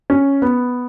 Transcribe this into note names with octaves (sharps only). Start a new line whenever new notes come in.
C#4
B3